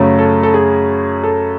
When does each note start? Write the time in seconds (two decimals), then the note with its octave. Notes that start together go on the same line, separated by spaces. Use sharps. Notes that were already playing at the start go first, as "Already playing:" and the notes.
Already playing: F#2 C#3 F#3 A3
0.19 A4
0.43 A4
0.54 G#4
1.24 A4